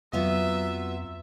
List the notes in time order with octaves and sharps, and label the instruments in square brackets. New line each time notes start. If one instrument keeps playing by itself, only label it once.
[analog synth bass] F2 [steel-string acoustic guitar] F#3 B3 F4 [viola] E5